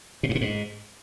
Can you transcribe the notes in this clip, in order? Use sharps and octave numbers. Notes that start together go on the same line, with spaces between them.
B2
G2
A#2
G#2